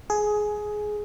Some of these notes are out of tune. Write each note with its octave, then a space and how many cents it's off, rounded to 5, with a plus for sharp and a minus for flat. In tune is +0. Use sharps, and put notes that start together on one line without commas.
G#4 +15